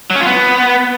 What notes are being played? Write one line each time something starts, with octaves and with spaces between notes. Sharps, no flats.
F#3
C#4
F4
B3